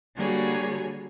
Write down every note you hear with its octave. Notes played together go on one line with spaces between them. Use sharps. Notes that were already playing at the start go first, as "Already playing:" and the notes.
D3 G3 A#3 F#4 G#4 C#5